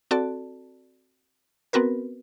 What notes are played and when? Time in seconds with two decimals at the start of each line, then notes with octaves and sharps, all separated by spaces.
0.11 C4 F#4 A4 D5 A5
1.73 B3 C4 F#4 A#4 B4